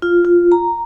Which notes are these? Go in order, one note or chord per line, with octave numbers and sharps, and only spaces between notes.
F4
F4
A#5